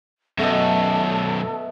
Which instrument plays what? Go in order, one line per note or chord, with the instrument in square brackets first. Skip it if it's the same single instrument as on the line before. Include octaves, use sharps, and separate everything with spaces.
[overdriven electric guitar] F#2 B2 [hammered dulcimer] A3 B3 D#5 [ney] A4